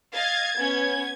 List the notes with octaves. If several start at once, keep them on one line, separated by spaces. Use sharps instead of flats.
D#5 F5 G#6 A6
B3 C#4